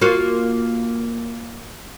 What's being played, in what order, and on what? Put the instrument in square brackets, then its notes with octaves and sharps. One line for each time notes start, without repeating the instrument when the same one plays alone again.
[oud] A#3 F4 F#4